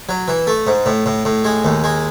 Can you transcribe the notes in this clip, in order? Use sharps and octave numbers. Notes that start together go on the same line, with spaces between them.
F#3
E3
A3
G#2
A2
A2
A2
G#3
D#2
G#3